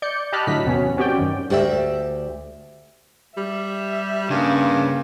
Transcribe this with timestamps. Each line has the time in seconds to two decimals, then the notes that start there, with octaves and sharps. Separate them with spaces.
0.02 D5 G6 C#7
0.32 G4 D#5 A5 B5 F6 F#6
0.47 A2 D3 F#3 B6
0.65 E2 C3 F#3 B3 C#4
0.97 C4 C#4 F#4 G4 D5 G5
1.18 F#2 D#3
1.50 D2 G4 D5 E5
3.37 G3 E5
4.31 G2 C#3 A#3